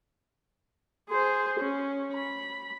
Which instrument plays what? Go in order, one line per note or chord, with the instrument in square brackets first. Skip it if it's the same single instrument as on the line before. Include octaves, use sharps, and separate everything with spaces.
[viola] G#4 C5
C#4
B5